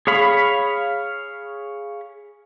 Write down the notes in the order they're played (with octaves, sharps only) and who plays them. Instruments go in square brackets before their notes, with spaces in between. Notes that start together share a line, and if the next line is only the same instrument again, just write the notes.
[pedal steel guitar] G#4 C#5 F5 B5